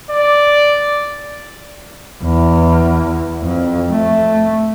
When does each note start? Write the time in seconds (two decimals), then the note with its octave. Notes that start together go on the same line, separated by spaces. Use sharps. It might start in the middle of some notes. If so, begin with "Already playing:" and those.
0.10 D5
2.23 E2
3.43 F2
3.92 A3